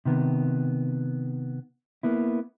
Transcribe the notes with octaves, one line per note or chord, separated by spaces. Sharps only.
C3 D#3 B3
A#3 B3 E4